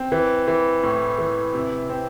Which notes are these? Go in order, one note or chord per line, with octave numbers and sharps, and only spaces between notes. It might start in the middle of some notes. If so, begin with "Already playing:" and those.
Already playing: C4
E3
E3
A2
E3
C3
C4